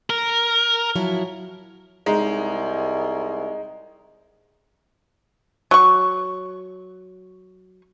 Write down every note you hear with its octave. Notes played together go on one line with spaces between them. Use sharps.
A#4
F3 F#3 E4
C2 G#3 D#4
F#3 C#6